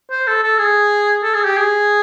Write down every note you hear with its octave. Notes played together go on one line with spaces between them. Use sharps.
C5
A4
A4
G#4
A4
G#4
G4
G#4